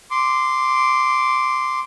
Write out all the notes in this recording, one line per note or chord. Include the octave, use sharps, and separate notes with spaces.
C6 D6